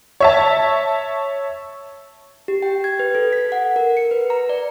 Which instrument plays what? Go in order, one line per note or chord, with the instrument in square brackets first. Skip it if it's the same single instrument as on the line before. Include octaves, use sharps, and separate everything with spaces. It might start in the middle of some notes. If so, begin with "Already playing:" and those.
[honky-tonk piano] C#5 E5 A5
[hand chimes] G4
G5
G#6
B4
A4
B6
F#5
A#4
C#7
B4
A#5
D5